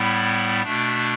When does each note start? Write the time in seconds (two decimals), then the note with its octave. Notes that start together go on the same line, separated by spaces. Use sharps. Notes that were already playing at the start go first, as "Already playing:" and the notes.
Already playing: A2 G3 B3 E4
0.63 B2 A3 D4